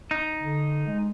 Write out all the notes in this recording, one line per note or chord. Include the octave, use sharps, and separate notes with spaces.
D#4
D3
G#3